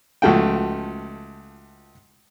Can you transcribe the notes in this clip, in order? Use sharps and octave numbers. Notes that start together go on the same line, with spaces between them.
C#2 F3 A3 F#4 G5